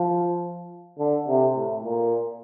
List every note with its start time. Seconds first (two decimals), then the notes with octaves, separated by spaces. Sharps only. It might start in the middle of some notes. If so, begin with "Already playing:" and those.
Already playing: F3
0.99 D3
1.28 C3
1.56 A2
1.84 A#2